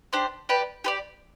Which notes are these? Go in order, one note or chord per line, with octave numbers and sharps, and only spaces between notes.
D4 G4 C5
G4 B4 D5
G4 B4 D5